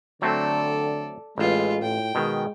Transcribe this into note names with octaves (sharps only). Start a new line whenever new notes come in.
D3 F#3 A3 C4 A4 D5
A1 G#3 F4 B4
A2 G5
B2 D#3 G#3